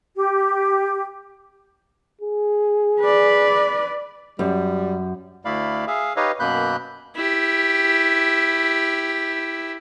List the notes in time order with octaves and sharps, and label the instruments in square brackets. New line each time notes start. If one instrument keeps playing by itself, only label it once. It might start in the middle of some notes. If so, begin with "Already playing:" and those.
[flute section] G4
[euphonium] G#4
[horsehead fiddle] B4 D5
[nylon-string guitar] F#2 [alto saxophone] G3
[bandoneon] D2 A3 E4 D5 F5 B5
G#4 E5 F5
D#4 G4 B4 C#5 D#5 F5
F#2 B2 A#3 B5 F#6 G6
[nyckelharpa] E4 G4